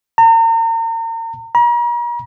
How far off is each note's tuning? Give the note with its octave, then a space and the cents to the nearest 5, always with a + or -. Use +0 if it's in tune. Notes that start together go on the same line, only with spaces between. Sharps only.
A#5 -40
A#5 +40